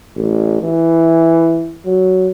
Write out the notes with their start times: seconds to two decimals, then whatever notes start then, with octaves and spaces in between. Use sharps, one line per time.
0.16 A1
0.61 E3
1.86 F#3